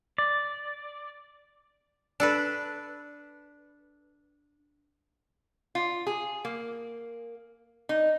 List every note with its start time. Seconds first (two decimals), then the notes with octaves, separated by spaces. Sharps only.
0.18 D5
2.20 D4 A4 B4
5.75 F4
6.07 G#4
6.45 A#3
7.89 D#4